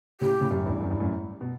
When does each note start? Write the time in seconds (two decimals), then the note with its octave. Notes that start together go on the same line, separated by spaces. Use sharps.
0.21 A2 C#3 G4
0.41 A2 C#3
0.51 F#2 A2
0.66 E2 G2
0.81 F#2
0.90 E2 G2
1.00 F#2 A2
1.41 B2